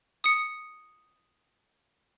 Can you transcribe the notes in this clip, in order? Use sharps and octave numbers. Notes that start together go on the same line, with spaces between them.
D#6 C#7